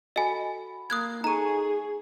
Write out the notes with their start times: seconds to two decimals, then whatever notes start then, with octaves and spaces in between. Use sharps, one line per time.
0.16 F#4 A4 D#5 G#5 B5
0.90 A#3 D#6 F#6 G#6
1.24 D#4 G#4 A4 A#5 C#6 D#7